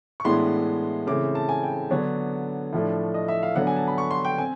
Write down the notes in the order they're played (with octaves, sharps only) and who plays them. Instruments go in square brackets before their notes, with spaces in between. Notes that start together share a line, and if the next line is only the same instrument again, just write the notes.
[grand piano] C#6
A2 E3 G#3 B3 D4 C6
C#3 E3 A3 C4 D6
A5
G#5
G5
D3 F#3 B3 D4 C#5
A2 F3 A3 D4
D#5
E5
F5
D3 F#3 B3 D4 F#5
G#5
A5
B5
C#6
C6
G5
C4 G#5